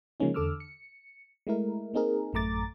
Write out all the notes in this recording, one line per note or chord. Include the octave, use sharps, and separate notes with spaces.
C#3 F3 G#3 A#3 C#4 D#4
E2 D3 A4 D6 E6 F6
C#7
G#3 A3 E4 A#4
A#3 C4 D#4 G#4 A#4
A1 F#2 A3 A#5 D6 A6